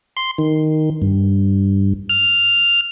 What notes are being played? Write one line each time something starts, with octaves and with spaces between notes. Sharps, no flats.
C6
D#3
G2
F6